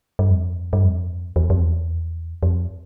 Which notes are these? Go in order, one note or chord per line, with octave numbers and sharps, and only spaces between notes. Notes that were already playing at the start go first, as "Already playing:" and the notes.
G2
F2
G2
F2
E2
F2
E2
F2